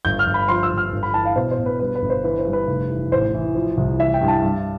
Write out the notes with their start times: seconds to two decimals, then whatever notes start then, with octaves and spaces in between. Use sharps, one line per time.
0.05 G1 G6
0.19 F6
0.27 G1
0.34 B5
0.48 F3 C6
0.63 E6
0.71 G1
0.78 F6
0.92 G1
1.03 B5
1.14 E3 A5
1.25 F5
1.36 B2 C5
1.51 C5
1.59 B2
1.66 B4
1.80 G2 B4
1.95 B4
2.02 G1
2.10 C5
2.23 E3 B4
2.38 C5
2.45 G2
2.53 B4
2.68 F1
2.90 E3
3.12 A1 C5
3.34 E3
3.55 F3
3.77 C2
3.99 E3 E5
4.14 G5
4.21 G2
4.28 A5
4.43 G2